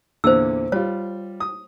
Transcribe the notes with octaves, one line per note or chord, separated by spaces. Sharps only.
E2 A#2 D3 C5 E6
G3 F4 C#5
D#6